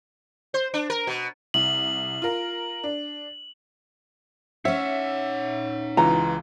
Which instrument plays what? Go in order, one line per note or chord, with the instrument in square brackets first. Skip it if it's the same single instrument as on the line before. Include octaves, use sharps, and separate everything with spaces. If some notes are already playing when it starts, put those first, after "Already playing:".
[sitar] C5
D4
A#4
B2
[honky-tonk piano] C2 [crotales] F#7
[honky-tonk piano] F4 A#4
D4
[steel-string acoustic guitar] C#4 C#5 [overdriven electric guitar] D#4 F#5 [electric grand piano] E5
[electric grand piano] C#2 E3 F4 [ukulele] A#5